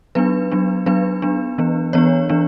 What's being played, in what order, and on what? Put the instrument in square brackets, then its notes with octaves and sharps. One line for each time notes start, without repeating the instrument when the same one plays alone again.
[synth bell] F#3 B3 D4 B4
F#3 B3 D4
F#3 B3 D4 B4
F#3 B3 D4
E3 B3 D4
E3 B3 D4 C#5
E3 B3 D4